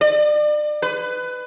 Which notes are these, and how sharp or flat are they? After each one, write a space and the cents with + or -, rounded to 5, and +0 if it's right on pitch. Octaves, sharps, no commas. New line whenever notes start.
D5 +35
B4 +20